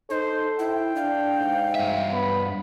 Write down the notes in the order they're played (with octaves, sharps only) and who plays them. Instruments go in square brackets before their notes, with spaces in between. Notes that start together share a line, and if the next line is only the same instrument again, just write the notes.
[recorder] D#4 [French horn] A4 [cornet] C5
[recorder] E4 [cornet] G5
[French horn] D4 [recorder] F5
[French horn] G#2
[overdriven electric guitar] G2 E5
[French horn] B3 [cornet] B5